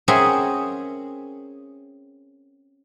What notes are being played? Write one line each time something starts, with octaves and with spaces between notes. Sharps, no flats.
C4 C#4 G#4 A#4 E5 F#5